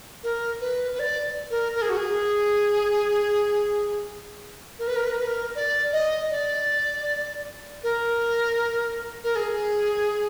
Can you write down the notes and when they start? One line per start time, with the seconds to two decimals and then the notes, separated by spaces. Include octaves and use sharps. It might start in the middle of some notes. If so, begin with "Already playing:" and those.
0.23 A#4
0.61 B4
0.94 B4
0.99 D5
1.51 A#4
1.75 A#4
1.82 G#4
1.90 F#4
1.97 G#4
4.79 A#4
4.87 B4
4.96 A#4
5.04 B4
5.11 A#4
5.19 B4
5.27 A#4
5.55 D5
5.93 D#5
6.31 D5
7.83 A#4
9.24 A#4
9.36 G#4